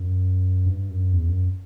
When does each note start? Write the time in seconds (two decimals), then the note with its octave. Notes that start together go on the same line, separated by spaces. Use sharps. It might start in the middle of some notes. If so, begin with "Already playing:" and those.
Already playing: F#2
0.66 G2
0.90 F#2
1.13 E2
1.28 F#2